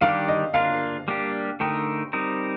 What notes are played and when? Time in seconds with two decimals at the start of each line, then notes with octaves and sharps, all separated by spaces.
0.01 D#3 G3 D4 G4 F5
0.28 D#5
0.54 A#3 D4 F4 F5
1.08 G3 A#3 D4 G4
1.60 D3 A3 D#4 A#4 G5
2.13 G3 C4 D#4 A#4